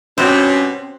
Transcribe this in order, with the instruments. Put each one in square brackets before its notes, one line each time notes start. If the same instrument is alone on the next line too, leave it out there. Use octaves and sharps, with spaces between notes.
[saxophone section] G2 B2 [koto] C4 [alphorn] C#4